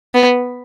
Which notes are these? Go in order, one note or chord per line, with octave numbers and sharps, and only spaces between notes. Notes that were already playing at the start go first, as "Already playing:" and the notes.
B3